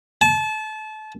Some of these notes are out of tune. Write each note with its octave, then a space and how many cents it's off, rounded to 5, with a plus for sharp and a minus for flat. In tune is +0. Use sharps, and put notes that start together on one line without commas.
A5 -30